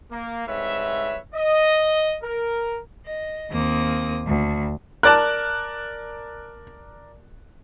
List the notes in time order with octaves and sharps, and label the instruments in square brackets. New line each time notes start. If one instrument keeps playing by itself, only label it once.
[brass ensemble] A#3
C2 G#2 C4 B4 C#5 E5
D#5
A#4
[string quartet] D#5
D#2 A#3 C4 D#6
D2
[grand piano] A#4 D5 A5 [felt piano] F#6